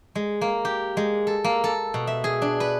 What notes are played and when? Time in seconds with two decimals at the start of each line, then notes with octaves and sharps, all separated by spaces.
0.15 G#3
0.41 A#3
0.65 G4
0.97 G#3
1.27 A4
1.44 A#3
1.64 A4
1.94 B2
2.07 E5
2.24 G#4
2.42 D4
2.60 B4